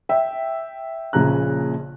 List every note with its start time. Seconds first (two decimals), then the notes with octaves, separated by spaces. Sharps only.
0.09 E5 G5
1.13 A#1 A#2 C#3 C#4 A#5 F#6